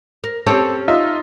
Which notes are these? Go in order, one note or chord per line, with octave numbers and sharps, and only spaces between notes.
A#4
C4 C#4 G4 A4 C#5
D#4 F4 E5